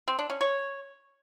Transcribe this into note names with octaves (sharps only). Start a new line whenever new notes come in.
C4
D4
C#4
C#5